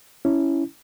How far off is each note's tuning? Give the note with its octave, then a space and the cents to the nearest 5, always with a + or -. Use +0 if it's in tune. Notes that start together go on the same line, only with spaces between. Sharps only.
C#4 +0 E4 -5